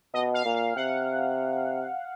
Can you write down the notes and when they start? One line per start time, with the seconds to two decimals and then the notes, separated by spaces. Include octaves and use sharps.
0.14 B2 D#5
0.34 F5
0.45 A#2
0.55 F5
0.76 C3 F#5